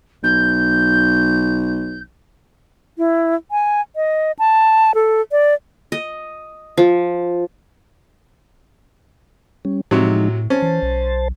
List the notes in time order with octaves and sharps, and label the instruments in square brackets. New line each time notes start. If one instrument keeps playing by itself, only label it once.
[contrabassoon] B1 [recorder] G6
[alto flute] E4
G#5
D#5
A5
A4
D5
[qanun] D#5
F3
[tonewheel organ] G3 C#4
[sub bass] A2 [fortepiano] C3 F#3 [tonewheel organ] F3 G#3 D#4
[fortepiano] C#4 [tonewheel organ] C5 A5
[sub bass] E3
B1